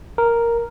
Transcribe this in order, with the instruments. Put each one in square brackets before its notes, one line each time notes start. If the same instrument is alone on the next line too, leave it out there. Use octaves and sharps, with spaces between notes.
[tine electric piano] A#4